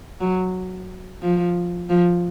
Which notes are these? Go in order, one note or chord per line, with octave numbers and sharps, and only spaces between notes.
F#3
F3
F3